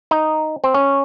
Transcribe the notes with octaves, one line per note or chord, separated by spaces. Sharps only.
D#4
C4
C#4